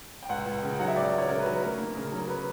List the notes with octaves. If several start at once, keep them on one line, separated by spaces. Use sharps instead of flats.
G5
C#2 F#5
C#2
G5
C#3
G5
F#3 F#5
E5
C#2 D5
C#2
C#5
C#3 A#4
B4
F#3
D2 A#4
A#3
C#3 A#4
F#3
A#4
B4